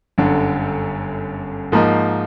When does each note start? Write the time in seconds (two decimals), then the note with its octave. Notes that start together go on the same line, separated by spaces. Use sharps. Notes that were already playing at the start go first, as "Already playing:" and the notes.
0.18 G1 F#2 D3
1.72 G#2 F3 A#3 D#4